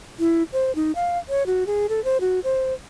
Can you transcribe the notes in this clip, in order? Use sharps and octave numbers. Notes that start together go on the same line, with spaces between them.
E4
C5
D#4
F5
C#5
F#4
G#4
A4
C5
F#4
C5